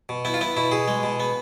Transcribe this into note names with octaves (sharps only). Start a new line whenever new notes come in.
B2
B3 E4
F4
B3 E4
B2 E4
B2 G#4
G#3
B2
B3